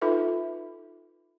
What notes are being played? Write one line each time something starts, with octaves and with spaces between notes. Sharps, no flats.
D#4 F4 A4 B4 E5